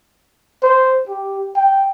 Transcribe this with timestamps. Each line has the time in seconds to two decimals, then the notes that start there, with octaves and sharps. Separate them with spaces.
0.63 C5
1.09 G4
1.56 G5